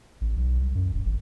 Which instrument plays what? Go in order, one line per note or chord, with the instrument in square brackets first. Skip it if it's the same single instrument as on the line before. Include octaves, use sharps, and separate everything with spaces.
[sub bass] A1
B1
C2
F#2
D#1
G#1